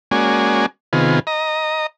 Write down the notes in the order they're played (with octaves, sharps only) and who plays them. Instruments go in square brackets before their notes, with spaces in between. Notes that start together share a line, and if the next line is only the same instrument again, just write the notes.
[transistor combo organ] G#3 A#3 C#4 F#4 D5 G#5
C3 D#3 B3 F4 G#4
D#5 A#5